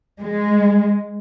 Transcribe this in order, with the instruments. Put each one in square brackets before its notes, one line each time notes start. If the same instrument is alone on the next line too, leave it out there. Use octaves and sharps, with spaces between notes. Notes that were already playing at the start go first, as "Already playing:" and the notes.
[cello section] G#3